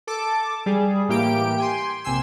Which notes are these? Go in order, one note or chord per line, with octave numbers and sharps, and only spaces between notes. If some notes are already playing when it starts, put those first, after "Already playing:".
A4 A5 D6
G3 G#4
A2 E3 A#3 G4 G5 D7
G5 G#5 C6
A#1 C3 G#5 C6 E6 C7